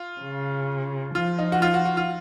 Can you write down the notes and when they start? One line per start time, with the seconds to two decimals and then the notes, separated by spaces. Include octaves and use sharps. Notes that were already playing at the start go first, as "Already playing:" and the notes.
Already playing: F4
0.21 C#3
1.15 F3 F4
1.39 D#4
1.52 F#4
1.62 F4
1.74 F#4
1.85 F#4
1.97 F4